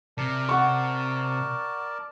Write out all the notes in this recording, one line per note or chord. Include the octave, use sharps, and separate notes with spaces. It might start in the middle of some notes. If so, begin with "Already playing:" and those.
C3 A#4 D5 A5
F#5 C#6